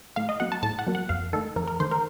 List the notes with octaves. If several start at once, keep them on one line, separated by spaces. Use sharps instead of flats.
A2 F5
D#5
F#3 A#3 F#5
A5
A2 A5
F#5
F#3 A#3
F#5
F2 F5
D#3 A3 A4
F2 A#4
A#4
D#3 A3 C5
A#4